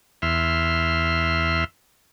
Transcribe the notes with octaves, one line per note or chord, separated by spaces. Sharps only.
E2 E5 C6 F6